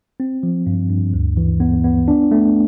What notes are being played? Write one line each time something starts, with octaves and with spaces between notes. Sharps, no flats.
C4
F3
G2
G2
D2
E3
B3
B3
D4
A3